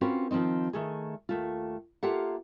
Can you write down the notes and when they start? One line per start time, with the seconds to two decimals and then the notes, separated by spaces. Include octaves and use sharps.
0.01 C4 C#4 F4 F#4 A#4 B4
0.31 D#3 F3 F#3 C4 D#4
0.73 D#3 A3 G#4
1.29 D#2 A3 F4
2.03 A#3 F4 G4 A4 E5 F#5